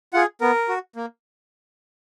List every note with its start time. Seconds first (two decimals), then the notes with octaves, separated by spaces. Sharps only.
0.13 F4 G#4 F#5
0.41 B3 A#4
0.69 F#4
0.96 A#3